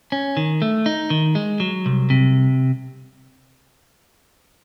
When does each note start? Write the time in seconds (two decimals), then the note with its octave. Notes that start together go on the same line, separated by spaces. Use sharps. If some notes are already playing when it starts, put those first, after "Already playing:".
0.12 C#4
0.37 D#3
0.62 A3
0.86 D#4
1.10 D#3
1.35 G#3
1.60 F#3
1.86 C2
2.10 C3